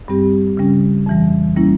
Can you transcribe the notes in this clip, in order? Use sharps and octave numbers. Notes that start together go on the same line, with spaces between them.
G2 G3 C4 G4
C#3 G3 C#4
F2 E3 G3
G3 A#3 C#4 E4